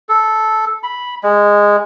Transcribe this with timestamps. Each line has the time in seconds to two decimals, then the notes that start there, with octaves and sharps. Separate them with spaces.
0.09 A4
0.83 B5
1.23 G#3